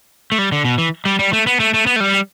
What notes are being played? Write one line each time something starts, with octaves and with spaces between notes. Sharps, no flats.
A3
G3
D3
B2
E3
G3
G3
A3
B3
A3
A3
B3
A3
G3